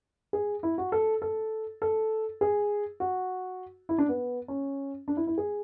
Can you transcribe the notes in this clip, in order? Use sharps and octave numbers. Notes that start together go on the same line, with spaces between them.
G#4
E4
F#4
A4
A4
A4
G#4
F#4
E4
D4
B3
C#4
D4
E4
E4
G#4